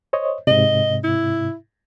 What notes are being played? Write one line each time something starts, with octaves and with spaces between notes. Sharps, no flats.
C5 C#5 D#5
G#2 C3 D#5
E4